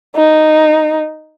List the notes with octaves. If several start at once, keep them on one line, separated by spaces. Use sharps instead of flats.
D#4